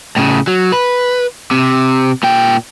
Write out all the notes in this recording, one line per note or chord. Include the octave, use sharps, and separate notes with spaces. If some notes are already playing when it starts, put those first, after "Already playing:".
A2 C#3
F#3
B4
C3
A#2 G5